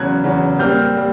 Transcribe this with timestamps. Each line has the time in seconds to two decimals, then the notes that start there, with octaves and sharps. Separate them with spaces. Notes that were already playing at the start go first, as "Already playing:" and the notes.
Already playing: E2 C#3 F#3 F#6 G#6
0.24 E2 C#3 F#3
0.59 A#2 G3 C4 F6 G6
0.96 A#2 G3